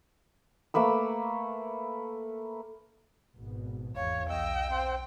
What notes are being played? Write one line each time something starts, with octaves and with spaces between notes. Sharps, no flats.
A3 A#3 B4 E6
G#1 B2
G#1 E2 C#5 F5
B1 D#5 G5 E6
C4 C5